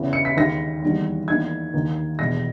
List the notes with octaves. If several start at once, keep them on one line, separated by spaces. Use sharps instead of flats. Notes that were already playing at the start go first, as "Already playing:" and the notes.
Already playing: E2 C#3 E3
C#7
B6
D#2 D#3 G#3 A#6
E2 D#3 G3 A#3
E2 D#3 A#3 G#6
D#2 D#3 A#3
E2 B2 G#3 A#6